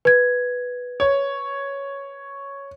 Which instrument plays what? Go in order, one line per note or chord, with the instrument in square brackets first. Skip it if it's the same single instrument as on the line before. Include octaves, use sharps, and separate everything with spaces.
[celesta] B4 G#6
[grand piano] C#5